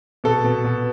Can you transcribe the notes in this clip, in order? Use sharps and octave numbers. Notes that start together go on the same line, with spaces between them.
B2 A4
B2
B2